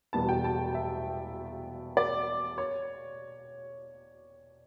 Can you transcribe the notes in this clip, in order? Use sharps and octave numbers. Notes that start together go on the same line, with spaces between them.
E1 E2 B2 G3 B3 A5
G5
A5
E5
D5
C#5